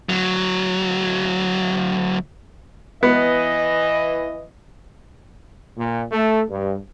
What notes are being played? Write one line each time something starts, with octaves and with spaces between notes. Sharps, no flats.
D2 F#3
E3 B3 D#5
A#2
A3
G2